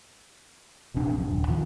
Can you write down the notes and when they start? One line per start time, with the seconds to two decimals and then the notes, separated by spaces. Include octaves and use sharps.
0.94 E1 A#1 C3 D4
1.14 B1 F#2
1.28 D#1
1.48 E2 B2 D#3 F3